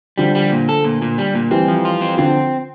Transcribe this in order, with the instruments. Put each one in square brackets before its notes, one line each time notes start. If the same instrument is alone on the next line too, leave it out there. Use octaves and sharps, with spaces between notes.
[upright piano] D3 F3 [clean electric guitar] G3
[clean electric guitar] G3
A#2
A4
A#2
A#2
G3
A#2
[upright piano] E3 G3 [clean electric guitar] C4
[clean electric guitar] F3
F4
C4
[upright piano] D3 F3 [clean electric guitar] C4